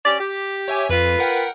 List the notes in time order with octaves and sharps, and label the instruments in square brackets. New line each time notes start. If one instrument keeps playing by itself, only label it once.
[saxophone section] C#4 G4 D5
G4
[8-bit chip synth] C#5 E5 G#5
[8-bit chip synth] F2 [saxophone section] F4 B4
[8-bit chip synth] A#4 F#5 G5